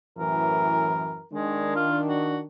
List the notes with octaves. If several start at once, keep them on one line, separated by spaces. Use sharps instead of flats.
F#2 A2 E3 A#4
D#3 G#3 D4
F4
F#4